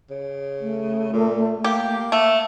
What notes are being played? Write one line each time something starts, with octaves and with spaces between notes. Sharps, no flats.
C#3
A3
A#2
A#3 G4
A3